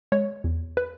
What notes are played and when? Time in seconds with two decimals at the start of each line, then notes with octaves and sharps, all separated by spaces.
0.12 G#3 C#5
0.44 E2
0.77 B4